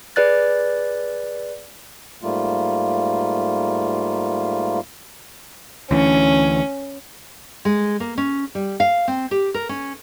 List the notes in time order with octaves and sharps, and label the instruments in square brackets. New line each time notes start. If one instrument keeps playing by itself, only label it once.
[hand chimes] G#4 B4 D5 F#6 A6
[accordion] G#2 G3 A3 A#3 F4
[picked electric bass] D2 E3 [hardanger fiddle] C#4
[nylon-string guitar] G#3
A#3
C#4
G3
F5
C4
G4
A#4
C#4